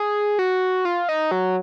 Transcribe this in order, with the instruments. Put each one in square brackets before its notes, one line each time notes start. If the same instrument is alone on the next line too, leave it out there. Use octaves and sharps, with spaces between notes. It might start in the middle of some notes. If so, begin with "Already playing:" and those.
Already playing: [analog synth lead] G#4
F#4
F4
D#4
F#3